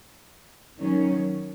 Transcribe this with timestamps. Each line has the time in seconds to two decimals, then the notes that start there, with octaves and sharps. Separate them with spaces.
0.78 D#3 F#3 C#4